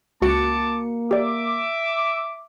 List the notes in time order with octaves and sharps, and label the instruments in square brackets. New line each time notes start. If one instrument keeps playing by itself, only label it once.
[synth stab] C#2 F#4 C#7 [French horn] A#3 [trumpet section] A5 D6
[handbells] G4 D5 [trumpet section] E5 D6